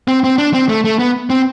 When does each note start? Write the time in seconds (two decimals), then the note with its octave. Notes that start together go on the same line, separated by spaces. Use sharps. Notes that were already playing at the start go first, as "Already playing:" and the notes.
0.08 C4
0.24 C4
0.38 D4
0.54 C4
0.69 A3
0.85 A3
0.99 B3
1.30 C4